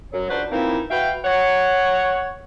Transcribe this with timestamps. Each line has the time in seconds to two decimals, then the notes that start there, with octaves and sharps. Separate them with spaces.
0.13 F#2 F#3
0.30 C#2 D4 F#4 B4 C5
0.51 E3 F3 A#3 C4 D#4 E4
0.90 F#4 B4 E5 F5 G5
1.25 C#5 F#5